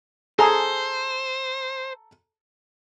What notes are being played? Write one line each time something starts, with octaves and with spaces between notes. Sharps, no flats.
G#4 A4 C5 A#5